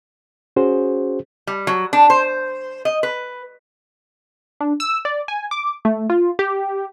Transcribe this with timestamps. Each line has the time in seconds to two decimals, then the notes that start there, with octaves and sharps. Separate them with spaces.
0.56 C#4 F#4 G#4 C5
1.47 G3
1.67 F#3
1.93 D4
2.10 C5
2.85 D#5
3.03 B4
4.60 D4
4.80 E6
5.05 D5
5.28 G#5
5.51 D6
5.85 A3
6.10 F4
6.39 G4